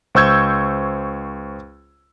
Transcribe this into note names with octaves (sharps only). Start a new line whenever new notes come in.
C#2 C5 C#6 E6 G6 G#6